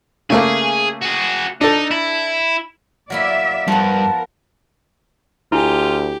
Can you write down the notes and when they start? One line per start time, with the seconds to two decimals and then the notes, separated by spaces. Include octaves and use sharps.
0.30 C#3 A3 A#3 G#4
1.02 F#4 G#4
1.61 D4 D#4 A4
1.91 E4
3.10 F#3 A#3 E4 D5 E5
3.68 G2 F3 B3 A#4 A5
5.52 D2 E4 F4 G4 G#5